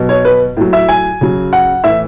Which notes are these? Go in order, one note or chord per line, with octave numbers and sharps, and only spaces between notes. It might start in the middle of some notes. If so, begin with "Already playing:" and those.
Already playing: B2 F#3
C#5
B4
A2 F#3
E5
G#5
C#3 F#3
F#5
A2 E3 E5